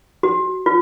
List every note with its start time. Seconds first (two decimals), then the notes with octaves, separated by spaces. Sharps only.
0.23 F#4
0.66 F4